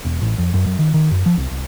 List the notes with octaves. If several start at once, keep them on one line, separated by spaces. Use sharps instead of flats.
E1
A1
F2
F#2
F#2
D#3
D#3
F#2
F3
C2
C2